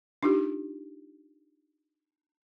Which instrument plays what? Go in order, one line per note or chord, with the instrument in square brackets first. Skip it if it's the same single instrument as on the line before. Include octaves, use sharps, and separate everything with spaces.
[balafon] D4 D#4 F4 G4